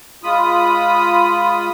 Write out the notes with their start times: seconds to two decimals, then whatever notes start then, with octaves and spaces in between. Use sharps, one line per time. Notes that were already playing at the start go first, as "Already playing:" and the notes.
0.24 G#3 F4 B5 D#6